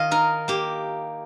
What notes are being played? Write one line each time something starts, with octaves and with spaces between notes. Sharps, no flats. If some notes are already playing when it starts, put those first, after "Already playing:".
Already playing: D#3 F4 D#5 F5
D#4 A#4
A#3 G4